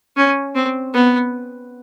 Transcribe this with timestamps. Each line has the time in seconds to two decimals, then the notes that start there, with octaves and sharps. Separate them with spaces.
0.17 C#4
0.55 C4
0.94 B3